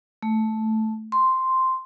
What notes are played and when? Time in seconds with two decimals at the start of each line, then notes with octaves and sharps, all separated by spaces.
0.22 A3
1.12 C6